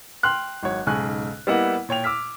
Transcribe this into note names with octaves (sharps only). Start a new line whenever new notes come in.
G5 C6 F6 F#6
G#1 F#3 C#5
B1 G#2 C#3 G#5 C#6 F#6
G3 A#3 B3 E4 D#5 F#5
A#2 C#5 G5 F7
D6 E6 F6 B6